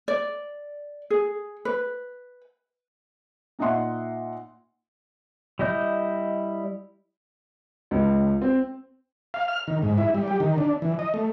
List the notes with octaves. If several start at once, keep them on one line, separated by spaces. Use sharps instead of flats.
D5
G#4
B4
A#2 D#4 D#5 E5 F#5 C6
G3 E4 D#5 G6
C#2
C4
F5
F6
D#3
G#2
E4
G3
G4
D#3
D4
E3
D#5
A3